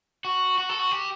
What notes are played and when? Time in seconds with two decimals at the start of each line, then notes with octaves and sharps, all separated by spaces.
0.25 F#4
0.58 F#4
0.69 A4
0.79 F#4
0.91 G4